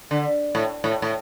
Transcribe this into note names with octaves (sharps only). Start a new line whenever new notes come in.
D3
A2
A2
A2